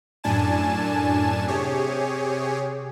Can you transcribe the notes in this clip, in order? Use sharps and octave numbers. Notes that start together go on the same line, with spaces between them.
F#2 A2 D4 G#5 A5 E7
C3 G4 G#4 C#5